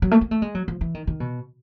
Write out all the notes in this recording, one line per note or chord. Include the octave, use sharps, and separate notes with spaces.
F#3
A3
A#3
A3
G#3
F#3
F3
E3
D#3
D#3
B2